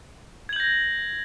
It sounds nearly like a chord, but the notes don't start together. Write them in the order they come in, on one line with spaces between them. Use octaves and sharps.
G#6 F#7 G6 A#6